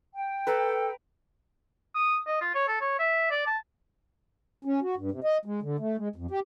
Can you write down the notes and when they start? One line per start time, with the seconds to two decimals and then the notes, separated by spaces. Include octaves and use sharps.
0.14 G5
0.47 A4 B4 A#5
1.95 D#6
2.27 D#5
2.41 F4
2.55 C#5
2.68 A4
2.81 C#5
2.99 E5
3.31 D5
3.46 A5
4.65 C#4
4.82 F#4
4.96 G2
5.11 C3
5.24 D#5
5.45 G#3
5.62 D3
5.80 A3
5.97 G#3
6.16 F2
6.31 G4